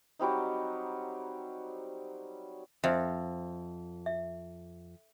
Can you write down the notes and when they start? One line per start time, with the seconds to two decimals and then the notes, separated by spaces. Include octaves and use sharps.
0.19 F#3 G3 C4 D#4
2.84 F2 C5 E5
4.06 E5